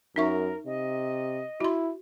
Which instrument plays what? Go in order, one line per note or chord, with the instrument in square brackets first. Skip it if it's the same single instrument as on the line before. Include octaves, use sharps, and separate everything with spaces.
[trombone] F#2 [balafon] D#4 E5 C#6 [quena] A#4
[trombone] C3 [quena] D#5
[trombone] E4 [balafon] F#4 C6